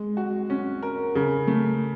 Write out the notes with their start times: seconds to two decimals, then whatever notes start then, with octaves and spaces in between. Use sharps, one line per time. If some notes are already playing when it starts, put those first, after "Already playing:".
Already playing: G#3
0.17 F#4
0.50 C#4
0.83 A#4
1.15 C#3
1.47 A3